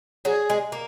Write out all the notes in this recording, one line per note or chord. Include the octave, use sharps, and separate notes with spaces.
F#3 G#4
G#3
A#3